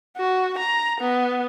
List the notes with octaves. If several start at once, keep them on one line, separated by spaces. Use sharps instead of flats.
F#4
A#5
B3